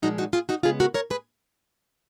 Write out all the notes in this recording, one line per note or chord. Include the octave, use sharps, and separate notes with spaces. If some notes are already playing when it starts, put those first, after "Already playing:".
A#2 F3 G#3 D#4 F#4
D#4 F#4
F4 G#4
D#4 F#4
C#3 G#3 B3 F4 G#4
F#4 A#4
A#4 C#5
G#4 B4